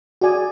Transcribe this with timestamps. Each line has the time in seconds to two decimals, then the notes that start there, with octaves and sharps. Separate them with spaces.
0.21 F#4 G#4 D5 G#5